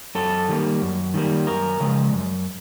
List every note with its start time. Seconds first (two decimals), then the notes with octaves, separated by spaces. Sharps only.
0.15 F#2 A4
0.49 D#3 G3 A#3
0.81 F#2
1.14 D#3 G3 A#3
1.47 F#2 A#4
1.80 C#3 F3 G#3
2.13 F#2